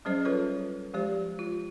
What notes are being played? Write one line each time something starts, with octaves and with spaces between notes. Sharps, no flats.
F#3 G3 C#4 G#4 C5 D#5
F4 A4 B4 C#5
F3 G#3 G4 C5
F4